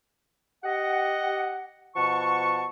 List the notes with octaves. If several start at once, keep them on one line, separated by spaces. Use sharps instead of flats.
G4 D#5 F#5
B2 F3 F#5 A5 C#6